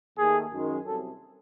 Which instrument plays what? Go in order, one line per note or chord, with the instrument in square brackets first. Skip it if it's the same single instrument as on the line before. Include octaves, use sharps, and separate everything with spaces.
[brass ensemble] D#2 D#3 A3 G#4
F#2 D#3 G#3
C2 C3 F#3 A4